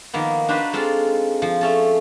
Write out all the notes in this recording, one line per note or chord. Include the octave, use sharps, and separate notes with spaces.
D#3 F3 A#3 B3
D4 D#4 F#4 G4 B4 C5
G#3 C4 F4 A4
F3
A3 C#4 A4